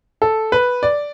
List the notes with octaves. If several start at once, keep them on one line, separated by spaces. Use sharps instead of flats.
A4
B4
D5